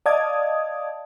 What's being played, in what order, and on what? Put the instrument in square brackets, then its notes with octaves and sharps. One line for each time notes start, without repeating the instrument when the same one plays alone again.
[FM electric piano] D5 D#5 F5 A5 D#6 G#6